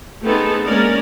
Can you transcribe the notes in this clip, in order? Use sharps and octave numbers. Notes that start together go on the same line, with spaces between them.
A3 B3 C4 D#4 G#4 A4
G#3 A#3 C#4 A#4 D5